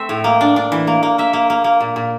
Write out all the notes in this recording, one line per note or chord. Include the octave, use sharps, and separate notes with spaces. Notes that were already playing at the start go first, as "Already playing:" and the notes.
Already playing: A3 C4 E5
A2
A#3
D4
D4
E3
A#3
A#3
A#3 E5
A#3
A#3
A#3
A#2
A#2